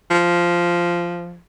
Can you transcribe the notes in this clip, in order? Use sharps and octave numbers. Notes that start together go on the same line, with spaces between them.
F3